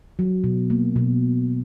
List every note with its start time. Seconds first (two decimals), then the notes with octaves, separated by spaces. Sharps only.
0.19 F#3
0.44 B2
0.70 A#3
0.96 B2